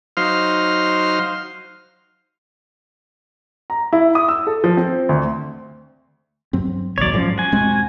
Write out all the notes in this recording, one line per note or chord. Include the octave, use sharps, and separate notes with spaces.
F#3 D#4 C5 F5 C6 F6
A#5
E4
D#6
E6
A4
F3
C4
D2
G2 F#3 C4
A#1 D#2 F#3 C#5 D5
G#2 F3 F#3 C#4
F#4 G#5
E1 G#3 C4